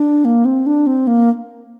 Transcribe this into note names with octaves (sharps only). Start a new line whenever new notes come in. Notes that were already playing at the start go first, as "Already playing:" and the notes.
Already playing: D4
A#3
C4
D4
C4
A#3